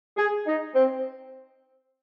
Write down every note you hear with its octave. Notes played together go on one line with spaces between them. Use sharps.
G#4
D#4
C4